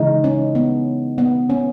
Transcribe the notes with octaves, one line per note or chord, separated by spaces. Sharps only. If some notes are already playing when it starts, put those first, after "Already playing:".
Already playing: C#3 E3 G#3 D#4
C#4
B3
B3
C#4